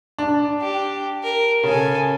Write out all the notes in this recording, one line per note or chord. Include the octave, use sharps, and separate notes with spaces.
D4
G4
A#4
C#3 A4 G#5